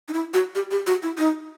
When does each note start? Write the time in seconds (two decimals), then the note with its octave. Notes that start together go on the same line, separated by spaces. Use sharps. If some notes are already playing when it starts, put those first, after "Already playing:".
0.08 D#4
0.13 E4
0.34 F#4
0.55 G4
0.71 G4
0.87 F#4
1.03 E4
1.18 D#4